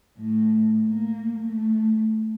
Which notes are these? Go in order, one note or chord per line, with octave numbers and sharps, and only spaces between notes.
A2
A#3
A3